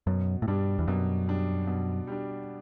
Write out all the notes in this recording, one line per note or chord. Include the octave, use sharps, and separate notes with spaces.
F#2 B2
A2
G2 G3 D4
E2
F#2 B2
G3 D4
B2
G3 D4